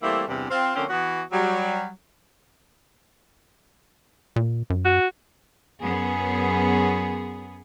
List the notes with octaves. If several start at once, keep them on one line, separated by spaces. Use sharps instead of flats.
E3 G3 A3 A#3 C4 E4
E2 G2 C3
C4 F4
D3 F3 A#3 C4 C#4
E3 B3 F#4
F#3 G3
A#2
F#2
F#4
F#2 B3 G#4